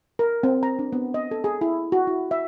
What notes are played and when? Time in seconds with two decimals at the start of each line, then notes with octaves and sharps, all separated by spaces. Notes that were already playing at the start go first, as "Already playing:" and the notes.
0.19 A#4
0.43 C4
0.63 A#5
0.79 D4
0.92 B3
1.14 D#5
1.31 A4
1.44 G#4
1.61 E4
1.92 F#4
2.07 E4
2.31 E5